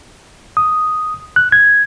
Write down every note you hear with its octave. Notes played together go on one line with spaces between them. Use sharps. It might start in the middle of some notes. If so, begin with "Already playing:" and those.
D#6
F#6
G#6